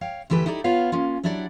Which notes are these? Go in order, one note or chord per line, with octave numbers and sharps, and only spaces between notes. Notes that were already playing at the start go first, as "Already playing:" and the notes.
C#5 F5 G5
D2 E3 G4 A4 B4
D#4 E4 G4 A4 C#5 D5
B3 F4 C#5 F5
A#3 C#4 F4
F#3 D4 E4 G4 D5 F#5